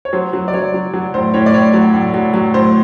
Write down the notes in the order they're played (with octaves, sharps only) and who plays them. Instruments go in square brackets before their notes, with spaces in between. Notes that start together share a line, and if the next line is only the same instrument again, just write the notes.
[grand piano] C#5
F#3 C5
F#3
D5
F#3 C#5
F#3
F#3
A2 C5
A2 C#5
D5
A2 C#5
F#3
A2
F#3
F#3
A2 C5